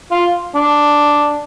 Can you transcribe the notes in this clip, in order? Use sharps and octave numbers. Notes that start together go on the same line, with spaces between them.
F4
D4